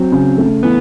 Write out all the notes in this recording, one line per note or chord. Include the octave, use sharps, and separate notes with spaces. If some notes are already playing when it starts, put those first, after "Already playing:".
Already playing: F#3 C4
C#3
A3
E3 B3